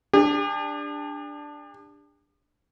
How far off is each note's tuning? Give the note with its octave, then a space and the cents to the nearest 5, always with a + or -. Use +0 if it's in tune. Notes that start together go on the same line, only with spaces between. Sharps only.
D4 +0 G4 +45